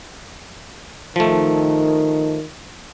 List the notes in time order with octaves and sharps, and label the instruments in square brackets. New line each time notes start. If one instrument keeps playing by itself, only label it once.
[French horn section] D#3 [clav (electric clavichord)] F3 A3